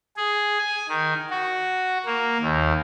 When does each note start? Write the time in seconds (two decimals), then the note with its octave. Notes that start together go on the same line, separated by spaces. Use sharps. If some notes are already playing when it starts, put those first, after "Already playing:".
0.17 G#4
0.58 G#5
0.89 D#3
1.30 F#4
2.06 A#3
2.41 D#2